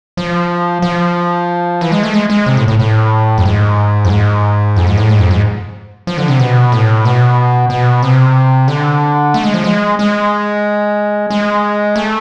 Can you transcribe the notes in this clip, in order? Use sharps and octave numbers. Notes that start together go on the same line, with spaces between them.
F3
F3
E3
G#3
A3
G#3
G#3
C3
A2
A2
A2
F2
G#2
F2
G#2
F2
G#2
A2
G#2
F2
G#2
F3
D3
C3
B2
A2
B2
B2
C3
D3
A3
G#3
F3
G#3
G#3
G#3
A3